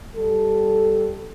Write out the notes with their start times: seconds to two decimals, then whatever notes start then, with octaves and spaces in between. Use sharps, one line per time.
0.15 G3 A4